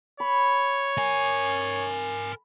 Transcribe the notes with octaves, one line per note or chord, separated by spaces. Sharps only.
C#5 B5
A#4 G#5